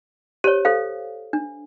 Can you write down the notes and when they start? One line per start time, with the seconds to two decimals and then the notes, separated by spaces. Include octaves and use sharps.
0.44 G4 C5 C#5
0.65 A4 C5 F5
1.33 D4